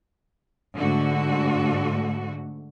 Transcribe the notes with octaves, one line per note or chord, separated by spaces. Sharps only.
G#2 D3 A3 F#4